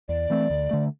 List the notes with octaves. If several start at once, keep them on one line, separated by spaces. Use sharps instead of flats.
E2 D5
E3 A3 C4
D2
D3 A3